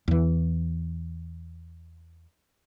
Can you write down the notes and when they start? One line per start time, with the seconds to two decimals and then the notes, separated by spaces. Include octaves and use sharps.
0.08 E2 E3